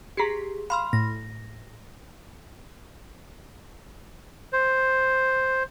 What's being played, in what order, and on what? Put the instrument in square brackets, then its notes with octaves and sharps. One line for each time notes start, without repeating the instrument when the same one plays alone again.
[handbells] G4 G#4 [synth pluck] A#5 B6 C7
[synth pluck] F5 [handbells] B5 C6 F6
[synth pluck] A2 [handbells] A#6
[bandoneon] C5